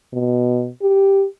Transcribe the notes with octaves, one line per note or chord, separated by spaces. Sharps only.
B2
G4